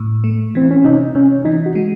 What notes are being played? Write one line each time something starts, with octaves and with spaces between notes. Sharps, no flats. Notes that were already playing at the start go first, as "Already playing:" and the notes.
Already playing: A2
A3
E3 C4
C#4
C3 D#4
C3 C#4
E3 D#4
F#4
G#3